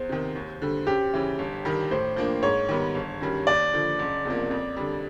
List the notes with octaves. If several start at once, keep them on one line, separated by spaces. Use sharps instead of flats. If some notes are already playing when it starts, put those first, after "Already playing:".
Already playing: E2 C5
C3 D#3
D#2
D3 G3
F#2 G4
C#3 E3
G1
G2 D#3 G3
A2 C5
F3 A#3 D4
G#2 C#5
D#3 G3 B3
G1
F#2 D#3 G3
D#2 D5
D3 F3
F#1
E2 C3 F3 A#3
F2
D3 G3